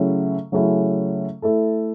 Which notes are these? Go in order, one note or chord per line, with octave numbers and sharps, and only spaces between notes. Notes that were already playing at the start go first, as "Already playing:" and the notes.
Already playing: C#3 F#3 A3 C#4 E4
C#3 F#3 A3 C#4 E4
A3 E4 A4